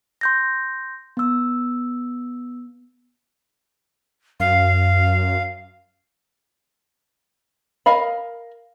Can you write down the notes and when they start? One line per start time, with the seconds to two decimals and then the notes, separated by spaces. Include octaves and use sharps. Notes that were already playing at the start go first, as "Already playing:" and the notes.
0.21 C6 G6 A#6
1.17 B3 E6
4.40 F#2 F5
7.86 A#4 D#5 F5 B5